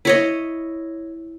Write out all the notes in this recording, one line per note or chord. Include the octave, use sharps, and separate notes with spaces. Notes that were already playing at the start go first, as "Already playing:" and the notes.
E4 C#5 D#5